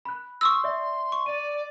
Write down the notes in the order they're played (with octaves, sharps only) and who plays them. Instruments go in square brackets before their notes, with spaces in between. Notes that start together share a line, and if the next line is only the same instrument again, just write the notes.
[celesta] B5 F#6
[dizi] C6 [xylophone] C#6 D#6 E6
[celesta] D5 E5
[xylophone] C#6
[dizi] D5 [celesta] D#7